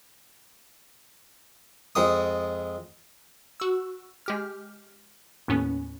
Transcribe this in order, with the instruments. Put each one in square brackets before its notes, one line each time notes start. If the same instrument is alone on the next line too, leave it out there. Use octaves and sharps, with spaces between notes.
[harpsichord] F2 G#3 D#6
[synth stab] F#4 E6
G#3 G4 F6
D#2 A2 B3 C#4